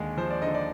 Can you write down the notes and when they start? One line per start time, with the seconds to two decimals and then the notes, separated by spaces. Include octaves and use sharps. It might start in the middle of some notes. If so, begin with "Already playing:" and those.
Already playing: D#2 D3 G#3
0.17 F3 C5
0.30 D5
0.42 D3 D#4 D#5
0.54 D5